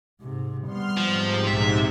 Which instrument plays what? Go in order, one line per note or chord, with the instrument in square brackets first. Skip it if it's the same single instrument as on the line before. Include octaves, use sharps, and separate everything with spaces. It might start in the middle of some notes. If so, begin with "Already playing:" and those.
[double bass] G#2 C3
[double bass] G3 B3 [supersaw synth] C6 F6
[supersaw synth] G#2 C3 [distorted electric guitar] F3
[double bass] A#1 [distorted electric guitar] E5